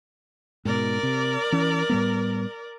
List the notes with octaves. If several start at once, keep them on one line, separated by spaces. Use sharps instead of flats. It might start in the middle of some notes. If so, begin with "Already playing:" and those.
G#2 B2 A#4 D5
C3
E3 C#4
A2 G3 B3